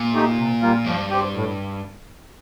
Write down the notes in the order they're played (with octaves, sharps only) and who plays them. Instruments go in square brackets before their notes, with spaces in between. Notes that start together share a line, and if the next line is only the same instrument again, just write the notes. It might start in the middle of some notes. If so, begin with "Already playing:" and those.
Already playing: [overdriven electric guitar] A#2
[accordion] A3 D#4 G4
C3
G3 A#3 F4
[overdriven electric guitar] G2 [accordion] F3
[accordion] C4 G4
A2